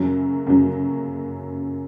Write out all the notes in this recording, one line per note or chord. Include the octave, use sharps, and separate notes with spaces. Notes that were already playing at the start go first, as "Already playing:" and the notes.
Already playing: F#2 C#3 F#3
F#2 C#3 F#3